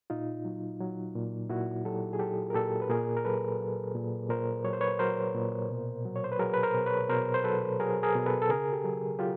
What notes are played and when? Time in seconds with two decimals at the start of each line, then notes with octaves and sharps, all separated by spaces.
0.10 A#2 D#4 F4
0.45 F#3
0.81 F#3
1.15 A#2
1.49 A#2 E4 F#4
1.85 F#3 G4 A4
2.13 G#4
2.19 F#3 G4 A4
2.50 A#4
2.54 A#2 G4 A4
2.82 B4
2.89 A#2 G#4 A#4
3.17 A#4
3.24 F#3 A4 B4
3.60 F#3
3.94 A#2
4.29 A#2 A#4 C5
4.64 F#3 C#5
4.73 C5
4.81 B4 C#5
4.99 F#3 A#4 C5
5.35 A#2
5.69 B2
6.05 F#3
6.16 C#5
6.24 C5
6.32 B4
6.39 F#3 G#4 A#4
6.54 B4
6.63 A#4 C5
6.75 B2
6.86 B4 C#5
7.09 B2 A#4 C5
7.34 C5
7.44 F#3 A4 B4
7.80 F#3 G#4 A#4
8.03 G#4 A#4
8.15 B2
8.26 A4 B4
8.42 A4
8.49 C#3 G#4 A#4
8.73 G4 A4
8.84 F#3
9.19 F#3 F4 G4